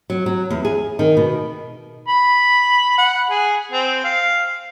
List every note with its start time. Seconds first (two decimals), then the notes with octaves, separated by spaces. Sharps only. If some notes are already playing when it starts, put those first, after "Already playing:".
0.10 F#3
0.26 F#3
0.50 E2
0.65 G#4
0.99 D#3
1.17 B2
2.08 B5
2.98 F#5
3.30 G#4
3.72 C4
4.04 F5